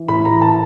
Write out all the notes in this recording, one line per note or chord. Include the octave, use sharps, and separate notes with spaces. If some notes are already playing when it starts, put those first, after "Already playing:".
Already playing: E3
A2 B5
A#5
E3
A5